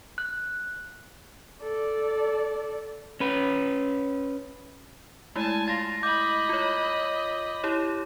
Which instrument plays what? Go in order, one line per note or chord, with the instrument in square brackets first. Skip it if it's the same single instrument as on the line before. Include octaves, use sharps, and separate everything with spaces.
[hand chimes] F#6
[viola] A4 D5
[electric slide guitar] C#4 B4
[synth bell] G#3 A3 E4 [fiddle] G#5 A5
[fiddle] F4 [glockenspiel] A6 A#6
[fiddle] D#5 B5 [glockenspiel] D6 G6
[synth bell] F4 C#5
E4 G4 C#5